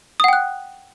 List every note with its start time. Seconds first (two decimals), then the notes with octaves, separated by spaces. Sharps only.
0.20 D#6
0.24 F#5
0.28 G5
0.33 F#6